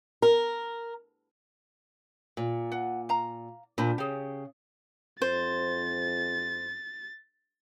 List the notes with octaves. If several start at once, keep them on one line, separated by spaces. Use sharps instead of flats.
A#4
A#2
F#5
F5 A#5
A#2 D4 C5 B5
C#3 G4 G#4
F2 C5 A6